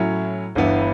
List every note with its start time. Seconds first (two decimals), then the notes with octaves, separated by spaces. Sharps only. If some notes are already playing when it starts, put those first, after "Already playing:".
Already playing: A2 F#3 C#4 E4
0.55 G1 G2 E3 B3 E4